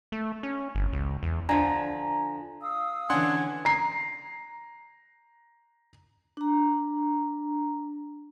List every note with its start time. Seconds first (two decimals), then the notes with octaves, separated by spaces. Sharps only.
0.12 A3
0.43 C#4
0.75 G1
0.93 C#2
1.23 E2
1.49 D3 F3 G#5 A#5
2.61 F5 D#6 E6
3.10 D3 E3 C#4 D4 F#5 G#5 C6
3.65 A#5 C7
6.37 D4 A#5